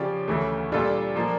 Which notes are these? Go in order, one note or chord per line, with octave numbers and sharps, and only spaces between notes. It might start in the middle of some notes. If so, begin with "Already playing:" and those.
Already playing: C#3 F3 C#4 G4 D5
D2 C#3 E3 A3
A#2 G3 D4 F4 A4
A#2 F3 A#3 D4